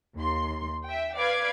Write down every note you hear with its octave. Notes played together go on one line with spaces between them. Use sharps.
D#2 C6
E5 G5
B4 D5 F5 B5 D6 G#6